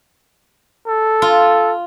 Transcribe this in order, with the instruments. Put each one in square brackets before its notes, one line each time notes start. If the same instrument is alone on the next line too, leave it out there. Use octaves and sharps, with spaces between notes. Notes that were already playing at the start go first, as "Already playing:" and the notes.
[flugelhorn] A4
[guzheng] F4